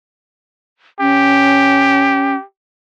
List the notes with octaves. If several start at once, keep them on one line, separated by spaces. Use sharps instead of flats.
C#4 G4